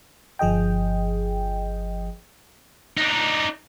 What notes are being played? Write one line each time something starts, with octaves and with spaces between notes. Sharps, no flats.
G1 F3 G#4 D#5 G5
D4 D#4